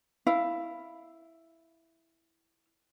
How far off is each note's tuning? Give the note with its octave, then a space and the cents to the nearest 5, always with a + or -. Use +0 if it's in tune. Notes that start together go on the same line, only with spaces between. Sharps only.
E4 +0 F5 -15